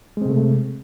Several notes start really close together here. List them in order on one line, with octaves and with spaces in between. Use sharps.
G#3 C4 C3 A3